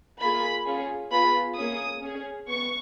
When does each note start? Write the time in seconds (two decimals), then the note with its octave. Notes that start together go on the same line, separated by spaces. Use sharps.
0.20 A#3 F4 G#4 B5
0.65 C#4 F4 G#4
1.11 B3 F4 G#4 B5
1.56 A#3 C#4 G#4 D#6
2.02 C#4 G#4
2.47 B3 C#6